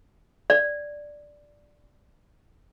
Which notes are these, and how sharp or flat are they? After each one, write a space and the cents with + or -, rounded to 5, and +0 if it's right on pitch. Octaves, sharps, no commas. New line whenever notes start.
D5 +0